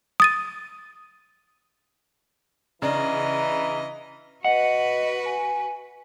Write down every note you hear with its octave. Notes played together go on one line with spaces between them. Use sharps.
D#6 A6 D#7
C#3 E3 D4 D#5 A#5
F#4 B4 D#5 F#5
G#5